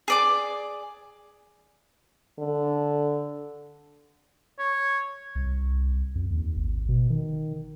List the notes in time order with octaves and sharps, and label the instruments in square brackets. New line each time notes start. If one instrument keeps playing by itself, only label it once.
[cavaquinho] G#4 D5 D6
[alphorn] D3
[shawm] C#5
[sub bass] C2
F2
D#2
G#1
B2
D#3